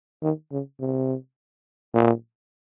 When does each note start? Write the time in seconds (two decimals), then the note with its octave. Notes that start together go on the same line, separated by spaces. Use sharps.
0.23 D#3
0.52 C#3
0.80 C3
1.94 A#2